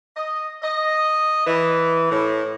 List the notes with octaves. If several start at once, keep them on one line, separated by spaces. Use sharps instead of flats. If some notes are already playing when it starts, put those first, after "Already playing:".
D#5
D#5
E3
A2